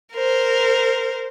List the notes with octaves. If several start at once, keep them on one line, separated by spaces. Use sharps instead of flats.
A#4 C5